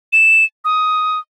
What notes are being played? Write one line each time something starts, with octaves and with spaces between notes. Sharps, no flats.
E7
D#6